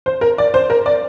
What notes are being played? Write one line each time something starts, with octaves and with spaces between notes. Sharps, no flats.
C5
A#4
D5
C5
A#4
D5